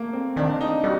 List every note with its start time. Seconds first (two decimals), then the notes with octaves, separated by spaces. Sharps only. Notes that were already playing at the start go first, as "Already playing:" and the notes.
Already playing: A3 A#3
0.13 C4
0.36 D#3 D4
0.61 D#4
0.84 G3 F#4